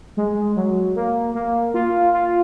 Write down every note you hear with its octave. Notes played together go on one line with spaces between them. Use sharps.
G#3
F#3
A#3
A#3
F4
F4